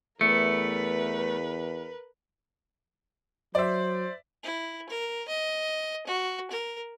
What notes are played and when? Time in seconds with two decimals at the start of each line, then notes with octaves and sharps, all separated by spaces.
0.21 E2 A3 A#4 B4 C#7
3.55 F#3 C5 D5 E5
4.43 E4
4.89 A#4
5.28 D#5
6.07 F#4
6.51 A#4